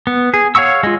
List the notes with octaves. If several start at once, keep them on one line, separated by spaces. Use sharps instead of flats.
B3
G#4
C#5 F5 F#5 C#6 E6
G#3 F4